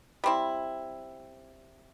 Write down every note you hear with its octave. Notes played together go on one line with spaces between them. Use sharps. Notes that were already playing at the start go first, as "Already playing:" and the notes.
G3 C4 E4